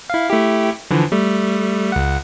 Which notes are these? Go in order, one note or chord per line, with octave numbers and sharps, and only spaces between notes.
E4 F5
A3 E4 G4
D3 E3 F3
G3 A3
C#2 F#5